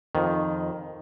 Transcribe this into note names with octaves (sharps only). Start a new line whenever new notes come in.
F2 D#3